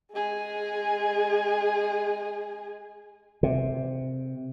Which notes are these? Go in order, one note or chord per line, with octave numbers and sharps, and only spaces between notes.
G#3 G#4
C3